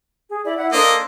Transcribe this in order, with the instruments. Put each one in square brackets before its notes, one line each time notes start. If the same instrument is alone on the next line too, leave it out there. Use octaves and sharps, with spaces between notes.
[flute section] G#4
E4 D5
E4 F#5
[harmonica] A#3 D#5 [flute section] D4 A4 C5